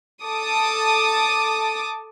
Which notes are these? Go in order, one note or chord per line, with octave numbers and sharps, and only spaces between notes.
A4 A5 D6 D#6